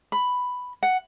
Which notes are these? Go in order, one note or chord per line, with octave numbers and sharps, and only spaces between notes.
B5
F#5